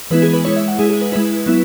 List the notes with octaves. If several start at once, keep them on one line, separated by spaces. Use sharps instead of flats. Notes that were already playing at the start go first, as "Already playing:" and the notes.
E3 G#3 B3 E4 B4
G#4
B4
G#3 E4 C#5
E5
F#5
G#3 E4 G#4
G#4
B4
G#3 E4 B4
F#3 B3 E4